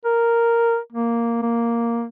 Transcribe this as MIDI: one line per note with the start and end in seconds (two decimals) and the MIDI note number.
0.05 0.78 70
0.92 1.39 58
1.42 2.06 58